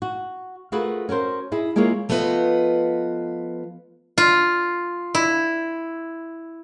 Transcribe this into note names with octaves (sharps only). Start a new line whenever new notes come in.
F#4
A3 F4 F#4 G#4 A#4 B4
C#4 F#4 A#4 C5
E4 G#4 D#5
G#3 A#3 E4 F4 G#4 C#5
F3 A3 B3 F4 B4 D#5
F4
E4